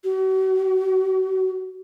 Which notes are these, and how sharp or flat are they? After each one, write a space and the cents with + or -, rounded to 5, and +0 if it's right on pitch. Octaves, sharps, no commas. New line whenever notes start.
F#4 +40